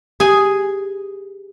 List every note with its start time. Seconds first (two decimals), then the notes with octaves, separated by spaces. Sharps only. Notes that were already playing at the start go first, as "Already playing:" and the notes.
0.20 G4 G#4 G#5